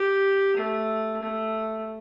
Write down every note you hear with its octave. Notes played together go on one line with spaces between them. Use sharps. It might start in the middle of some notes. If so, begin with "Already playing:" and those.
Already playing: G4
A3
A3